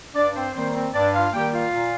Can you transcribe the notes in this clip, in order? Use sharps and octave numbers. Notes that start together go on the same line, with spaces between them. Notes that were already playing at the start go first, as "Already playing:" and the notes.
G2 D4 D5
C4 C5
D#3 G3 A#3 C4 C5
C4 C5
G2 D4 D5
F4 F5
D#3 G3 A#3 G4 G5
F4 F5
A#2